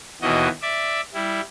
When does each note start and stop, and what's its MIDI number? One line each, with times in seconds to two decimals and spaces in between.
0.22 0.48 39
0.22 0.48 47
0.22 0.48 52
0.22 0.48 66
0.22 0.48 75
0.62 1.01 74
0.62 1.01 76
1.14 1.40 55
1.14 1.40 64